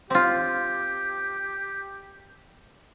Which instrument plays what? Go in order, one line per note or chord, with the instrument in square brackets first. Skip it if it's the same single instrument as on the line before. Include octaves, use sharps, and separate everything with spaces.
[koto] C4 F4 [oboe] G4